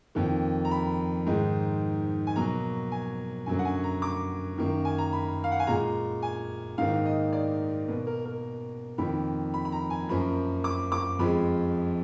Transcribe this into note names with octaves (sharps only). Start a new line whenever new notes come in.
F2 D#3 A#3
A#5
B5
G#2 D#3 G#3
G#5
B2 F#3 A#3 A#5
G#5
F#2 D3 F#3 A#3 G#5
F#5
G#5
A#5
D6
F#2 D#3 A#3
G#5
A#5
B5
F5
F#5
G#5
A#2 G#3 A#5
G#5
G#2 D#3 A#3 F5
D#5
D5
B2 A#3 B4
A#4
A#4
F2 D#3 A#3 B5
B5
B5
A#5
G#5
F#2 F3 A#3 B5
D6
D6
F2 F3 G#3 B5